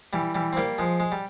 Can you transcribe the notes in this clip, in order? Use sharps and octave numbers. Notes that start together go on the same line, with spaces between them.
E3 G3
E3 G3
C4
G3 A#3
F3 G#3
G#3
G3